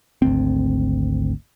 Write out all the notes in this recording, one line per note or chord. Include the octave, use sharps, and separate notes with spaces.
G#1 D2 C4